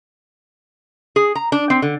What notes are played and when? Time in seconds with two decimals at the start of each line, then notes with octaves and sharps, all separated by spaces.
1.16 G#4
1.35 A#5
1.52 D4
1.70 C4
1.82 D3